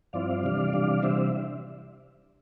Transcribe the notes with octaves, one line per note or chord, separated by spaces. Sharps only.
G2 F3 C4 E4 D5 F5
C3 E3 G3 D4
C3 E3 G3 D4
C3 E3 G3 D4 C5 E5